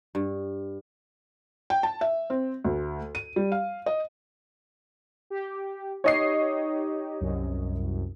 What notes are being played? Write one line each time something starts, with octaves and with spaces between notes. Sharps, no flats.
G2
G5
A5
E5
C4
D2
D#7
G3
F5
D#5
G4
D#4 G4 C#5 D#5 C7
C2 F#2